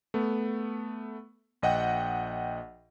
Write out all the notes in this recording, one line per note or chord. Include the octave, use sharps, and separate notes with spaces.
A3 B3
A#1 D#5 F#5 G5